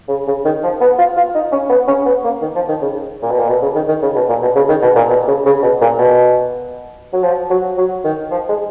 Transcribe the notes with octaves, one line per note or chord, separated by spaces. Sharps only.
C#3
C#3
D#3
F3
B3
F4
F4
D#4
C#4
B3
C#4
B3
A#3
D#3
F3
D#3
C#3
A#2
B2
A#2
B2
C#3
D#3
D#3
C#3
B2
A#2
B2
C#3
D#3
B2
A#2
B2
C#3
C#3
B2
A#2
B2
F#3
F3
F#3
F#3
D#3
F3
G#3